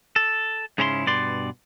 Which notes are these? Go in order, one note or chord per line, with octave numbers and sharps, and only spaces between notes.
A4
G#2 C#3 C#4 E4 A#5 C6
G2 B2 D5 C6